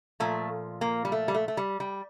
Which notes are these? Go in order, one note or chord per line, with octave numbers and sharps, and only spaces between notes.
A#2 F3 A3
A#3
G3
A3
G3
A3
A3
G3
G3